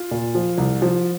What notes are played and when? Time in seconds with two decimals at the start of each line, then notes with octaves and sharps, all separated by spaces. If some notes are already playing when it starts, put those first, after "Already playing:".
Already playing: F4
0.11 A#2
0.35 F3
0.58 C2
0.82 F3